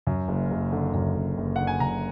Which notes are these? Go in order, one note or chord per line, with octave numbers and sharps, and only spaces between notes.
F#2
F#1
F#1
D3
F#2
F#1
F#1
D3 F#5
G#5
F#2 A#5